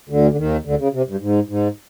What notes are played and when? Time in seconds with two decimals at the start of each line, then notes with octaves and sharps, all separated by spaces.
0.09 D2 D3
0.31 D3
0.37 D#2 D#3
0.65 D2 D3
0.79 C#3
0.93 C3
1.07 G2
1.20 G#2
1.48 G#2